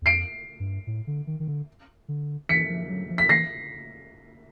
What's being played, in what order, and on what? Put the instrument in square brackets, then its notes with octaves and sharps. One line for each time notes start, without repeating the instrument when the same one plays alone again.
[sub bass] E2
[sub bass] F2 [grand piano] C7 D7
[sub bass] G2
A2
D3
D#3
D#3
D3
D3
[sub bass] E3 [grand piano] B6 C#7
[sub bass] F3
F#3
F3
[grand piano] B6
[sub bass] E3 [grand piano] A#6 C7